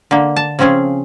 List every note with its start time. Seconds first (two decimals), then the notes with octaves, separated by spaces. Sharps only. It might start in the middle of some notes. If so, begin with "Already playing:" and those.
0.11 D3 A#3
0.36 A5
0.59 C#3 F3 C4 C#4 G#4